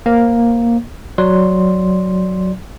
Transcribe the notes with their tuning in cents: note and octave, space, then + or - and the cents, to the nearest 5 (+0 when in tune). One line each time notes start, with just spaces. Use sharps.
A#3 +5 C5 +20
F#3 +0 D5 +0 C6 +0